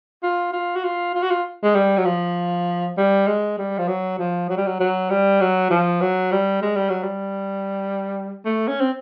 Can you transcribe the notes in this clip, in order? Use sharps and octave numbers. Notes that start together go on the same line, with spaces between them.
F4
F4
F#4
F4
F4
F#4
F4
G#3
G3
F#3
F3
G3
G#3
G3
F3
F#3
F3
F#3
G3
F#3
F#3
G3
F#3
F3
F#3
G3
G#3
G3
F#3
G3
A3
C#4
C4